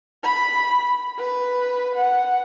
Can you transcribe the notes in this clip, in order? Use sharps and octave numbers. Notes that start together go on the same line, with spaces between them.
B5
B4
F#5